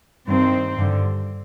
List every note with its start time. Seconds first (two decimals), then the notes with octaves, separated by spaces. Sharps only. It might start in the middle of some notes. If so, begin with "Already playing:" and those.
0.28 G2 D#3 C4
0.77 G2 D3